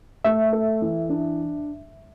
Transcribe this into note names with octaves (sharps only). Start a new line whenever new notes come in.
A3 E5
A4
E3
D4